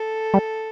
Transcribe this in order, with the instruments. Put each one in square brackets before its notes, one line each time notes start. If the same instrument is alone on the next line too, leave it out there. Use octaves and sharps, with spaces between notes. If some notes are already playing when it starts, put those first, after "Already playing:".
Already playing: [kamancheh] A4
[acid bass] G3